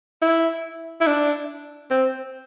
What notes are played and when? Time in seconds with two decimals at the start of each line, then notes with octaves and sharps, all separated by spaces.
0.22 E4
1.01 E4
1.07 D4
1.90 C4